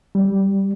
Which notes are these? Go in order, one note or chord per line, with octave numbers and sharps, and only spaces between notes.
G3